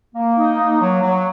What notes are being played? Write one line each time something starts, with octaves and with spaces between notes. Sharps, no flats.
A#3
D#4
A#3
F#3
F#3